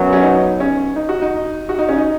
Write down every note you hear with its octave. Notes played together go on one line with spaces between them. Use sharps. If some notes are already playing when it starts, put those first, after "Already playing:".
Already playing: F#2 F#3 B3
C#4
D#4
C#4
D#4
F#4
D#4
F#4
D#4
C#4
D#4